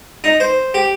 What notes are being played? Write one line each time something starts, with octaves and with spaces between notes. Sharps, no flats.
D#4
C5
G4